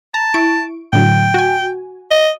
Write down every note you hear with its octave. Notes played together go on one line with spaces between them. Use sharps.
A5 A#5
E4 C#6 D7
A2 D3 F#3 G5
F#4 G#5
D#5